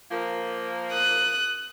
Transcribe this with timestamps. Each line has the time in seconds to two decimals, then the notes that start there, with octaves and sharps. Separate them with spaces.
0.11 F3 A#3
0.92 D#6 F#6